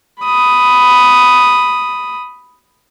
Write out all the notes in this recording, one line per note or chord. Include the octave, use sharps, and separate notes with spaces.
B5 D#6